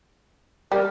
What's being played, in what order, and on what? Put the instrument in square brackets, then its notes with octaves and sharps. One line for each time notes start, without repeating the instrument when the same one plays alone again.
[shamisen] G3 [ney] A#4